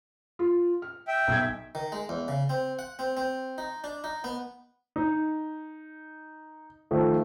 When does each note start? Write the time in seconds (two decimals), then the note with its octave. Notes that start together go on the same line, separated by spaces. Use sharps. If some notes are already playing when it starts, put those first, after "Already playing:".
0.39 F4
0.82 F6
1.08 E5 G5
1.28 B1 G#6
1.75 D#3
1.92 G#3
2.09 E2
2.28 C#3
2.49 C4
2.79 F#5
2.99 C4
3.17 C4
3.58 D#4
3.84 D4
4.04 D#4
4.24 B3
4.96 D#4
6.91 D#3 F3 A3